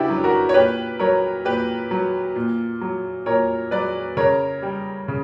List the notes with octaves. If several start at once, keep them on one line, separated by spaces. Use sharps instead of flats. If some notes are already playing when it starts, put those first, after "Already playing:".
Already playing: C#3 D4 E4 F#4 G4 B4
F#3
F#4 A#4
C#5
A#2 G4 B4
F#3 A#4 C#5
A#2 G4 B4
F#3
A#2
F#3
A#2 A#4 C#5
F#3 B4 D5
C#3 A#4 C#5
G3
C#3